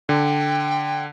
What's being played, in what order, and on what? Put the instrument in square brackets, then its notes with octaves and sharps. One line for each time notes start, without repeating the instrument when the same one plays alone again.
[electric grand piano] D3 [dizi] G5